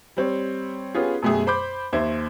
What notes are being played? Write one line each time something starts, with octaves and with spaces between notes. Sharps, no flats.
G3 C4 C#5
B3 C#4 F4 G4 G#4
F#2 B2 A3 G4 G#4
C5 B5 D6 G6
D#2 C5 E5 G#6